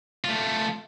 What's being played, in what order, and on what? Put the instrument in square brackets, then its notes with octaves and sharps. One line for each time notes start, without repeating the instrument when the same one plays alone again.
[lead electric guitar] A3 F4